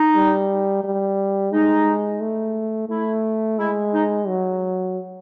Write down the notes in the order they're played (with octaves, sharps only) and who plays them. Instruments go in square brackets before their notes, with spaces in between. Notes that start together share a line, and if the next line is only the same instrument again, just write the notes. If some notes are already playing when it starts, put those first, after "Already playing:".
Already playing: [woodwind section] D#4
[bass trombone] G3
G3
[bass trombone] G#3 [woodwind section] D#4
[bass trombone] A3
[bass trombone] A3 [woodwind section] E4
[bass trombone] G#3 [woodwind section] E4
[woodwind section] D#4
[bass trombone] F#3